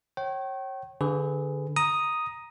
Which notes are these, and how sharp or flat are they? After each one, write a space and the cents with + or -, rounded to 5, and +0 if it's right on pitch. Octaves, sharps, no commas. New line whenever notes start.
C#5 -30 G5 -35
D3 +0 G#4 -5 B4 +25
A#5 +10 D#6 +0